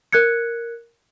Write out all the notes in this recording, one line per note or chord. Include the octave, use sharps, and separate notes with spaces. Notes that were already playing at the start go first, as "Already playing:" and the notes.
A#4 F#6 G#6 C#7